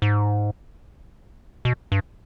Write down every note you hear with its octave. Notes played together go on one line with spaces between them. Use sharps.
G#2
B2
G2